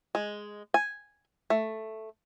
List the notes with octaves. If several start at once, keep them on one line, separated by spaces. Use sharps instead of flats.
G#3
G#5
A3